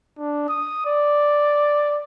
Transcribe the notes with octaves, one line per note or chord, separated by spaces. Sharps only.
D4
D#6
D5